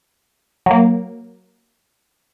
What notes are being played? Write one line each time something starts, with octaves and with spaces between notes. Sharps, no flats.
F#3 A#3